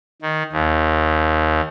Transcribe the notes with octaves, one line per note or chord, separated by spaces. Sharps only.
D#3
D#2